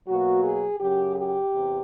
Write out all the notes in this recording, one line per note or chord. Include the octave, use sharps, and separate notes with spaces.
B2 F#3 A#3 F#4
G#4
F#2 C#3 F#3 G4
G4
E2 C3